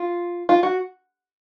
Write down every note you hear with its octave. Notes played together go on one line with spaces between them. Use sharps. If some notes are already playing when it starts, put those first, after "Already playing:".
Already playing: F4
F4
F#4